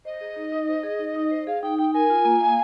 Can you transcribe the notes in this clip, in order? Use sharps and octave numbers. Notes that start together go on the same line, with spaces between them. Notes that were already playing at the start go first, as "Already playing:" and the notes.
C5 D#5
G#4
D#4
D#4
C5
G#4
D#4
D#4
C5
G#4 F5
D#4 G5
D#4 G5
A#4 G#5
F4
A#3
F5